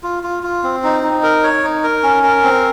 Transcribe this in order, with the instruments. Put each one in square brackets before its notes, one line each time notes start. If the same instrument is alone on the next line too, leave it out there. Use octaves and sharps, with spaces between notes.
[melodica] F4
F4
F4
C4
D#4
D#4
A#4
C#5
D#4
A#4
C#4
A#4
C4